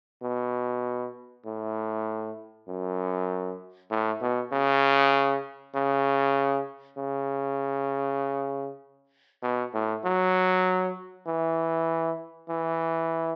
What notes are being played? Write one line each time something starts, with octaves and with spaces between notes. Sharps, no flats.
B2
A2
F#2
A2
B2
C#3
C#3
C#3
B2
A2
F#3
E3
E3